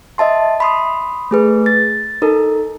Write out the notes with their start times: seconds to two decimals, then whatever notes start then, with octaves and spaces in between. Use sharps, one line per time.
0.18 D#5 E5 A5 C6
0.60 B5 C6 D#6
1.31 A3 G#4 B4
1.66 A6
2.22 D#4 A4 A#4